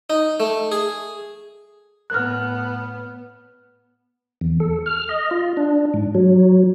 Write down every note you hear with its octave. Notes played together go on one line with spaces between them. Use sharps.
D#4
A3
G#4
A2 B3 F6 F#6
E2
A4
F6
D#5
F4
D4
G#2
F#3